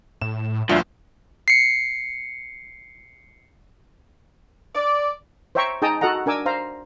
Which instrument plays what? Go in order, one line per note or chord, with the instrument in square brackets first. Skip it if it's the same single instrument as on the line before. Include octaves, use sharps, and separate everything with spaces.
[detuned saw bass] A2 [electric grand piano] E7
[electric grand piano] G1 D2 A#2 [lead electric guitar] F3 [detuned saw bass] G3 [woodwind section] D4 E5
[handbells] C7 C#7
[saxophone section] D5
[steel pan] C5 C#5 E5 G5 A#5 C#6
D#4 G#4 G5 A5 A#5 D#6
F#4 A4 D#5 F#5 A#5
D4 A#4 G#5 D6 E6
C5 F5 A#5